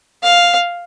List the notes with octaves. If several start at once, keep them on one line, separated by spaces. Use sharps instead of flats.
F5